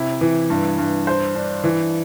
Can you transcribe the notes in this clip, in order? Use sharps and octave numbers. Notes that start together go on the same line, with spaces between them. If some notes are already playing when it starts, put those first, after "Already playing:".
Already playing: C3 E4
E3
G2
G2
C5
D4
E3